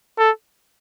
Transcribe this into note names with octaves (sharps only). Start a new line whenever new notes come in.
A4